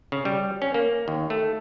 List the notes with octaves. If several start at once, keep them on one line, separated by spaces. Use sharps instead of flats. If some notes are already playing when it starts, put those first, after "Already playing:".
C#3
G3
C#4
A#3
D#2
A3